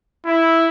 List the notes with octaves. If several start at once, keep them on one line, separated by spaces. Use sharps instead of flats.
E4